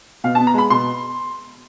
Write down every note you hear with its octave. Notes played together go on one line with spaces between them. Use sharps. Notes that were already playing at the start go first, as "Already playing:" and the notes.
B2 F5
A5
B3
A#5
G#3 B5
B2 C6